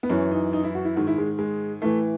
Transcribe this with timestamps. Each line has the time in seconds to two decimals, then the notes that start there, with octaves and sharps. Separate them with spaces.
0.03 B3
0.09 F#2 E3 C#4
0.31 D#4
0.53 D#4
0.64 E4
0.75 F#4
0.85 E4
0.96 G#2 D#3 F#4
1.07 E4
1.18 G#3
1.39 G#3
1.82 A2 E3 A3